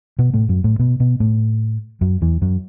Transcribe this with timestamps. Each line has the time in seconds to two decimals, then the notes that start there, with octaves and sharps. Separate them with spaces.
0.19 B2 B3
0.34 A2 A3
0.49 F#2 F#3
0.64 A2 A3
0.79 B2 B3
1.00 B2 B3
1.20 A2 A3
2.01 F#2 F#3
2.21 E2 E3
2.41 F#2 F#3